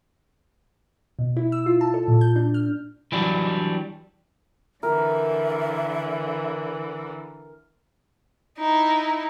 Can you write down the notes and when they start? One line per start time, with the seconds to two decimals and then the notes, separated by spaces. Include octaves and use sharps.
1.19 B2
1.37 E4
1.52 E6
1.66 F4
1.81 A5
1.94 A4
2.08 A#2
2.21 G6
2.36 D4
2.54 F6
3.12 E3 F#3 G3 D4
4.83 D3 E3 A#4 E5
8.59 D#4 E4